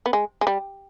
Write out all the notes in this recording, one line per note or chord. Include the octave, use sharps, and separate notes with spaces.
B3
G#3
G#3
G3